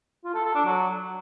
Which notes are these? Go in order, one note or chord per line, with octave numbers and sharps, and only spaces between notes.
F4
A4
A4
D4
F#3